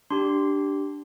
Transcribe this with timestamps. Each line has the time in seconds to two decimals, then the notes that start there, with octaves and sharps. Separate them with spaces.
0.10 D4 G4 C6